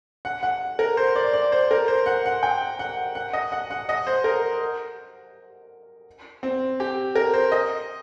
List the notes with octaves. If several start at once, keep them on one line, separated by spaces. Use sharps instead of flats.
F#5
F#5
A#4
C5
D5
D5
C5
A#4
C5
F#5
F#5
G5
F#5
F#5
D#5
F#5
F#5
D#5
C5
A#4
C4
G4
A#4
C5
D#5